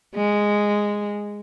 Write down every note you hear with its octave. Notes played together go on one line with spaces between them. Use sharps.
G#3